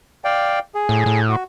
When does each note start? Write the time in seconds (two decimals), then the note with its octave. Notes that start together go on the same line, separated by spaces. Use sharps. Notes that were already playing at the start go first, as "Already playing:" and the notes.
0.25 D5 F5 G5
0.75 G#4
0.89 A2
1.06 A2
1.29 F#4